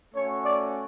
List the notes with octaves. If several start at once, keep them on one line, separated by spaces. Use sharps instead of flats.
A3 C#4 F#4 C#5
D5